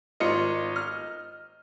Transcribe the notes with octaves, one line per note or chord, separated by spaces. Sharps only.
G#1 F4 D#5 C#7
F6